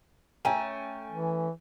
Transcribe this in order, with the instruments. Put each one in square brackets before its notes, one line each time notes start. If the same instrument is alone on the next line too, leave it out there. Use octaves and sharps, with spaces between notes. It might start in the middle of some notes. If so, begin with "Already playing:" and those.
[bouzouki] A3 C#4 [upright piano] G5 G#5 A#5
[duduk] E3